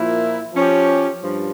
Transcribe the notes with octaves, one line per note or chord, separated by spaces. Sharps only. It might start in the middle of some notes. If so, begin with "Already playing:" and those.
Already playing: A#2 F3 A#3 E4
F3 C#4 G4
G2 F3